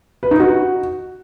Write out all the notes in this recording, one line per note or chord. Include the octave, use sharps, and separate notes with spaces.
B4
D#4
F#4